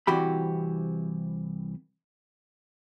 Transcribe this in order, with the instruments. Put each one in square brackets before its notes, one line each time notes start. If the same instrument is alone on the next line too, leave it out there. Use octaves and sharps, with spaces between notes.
[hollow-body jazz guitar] C2 C3 E3 F#4 G4 B5